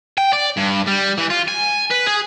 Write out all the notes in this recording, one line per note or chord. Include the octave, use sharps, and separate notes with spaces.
G5
D5
G2
G3
E3
F4
G#5
B4
G#4